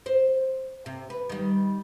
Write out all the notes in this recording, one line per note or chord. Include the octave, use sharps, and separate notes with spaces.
C5
C3
B4
D#3 G3